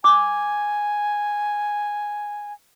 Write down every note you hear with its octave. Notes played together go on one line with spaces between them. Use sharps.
G#5 D6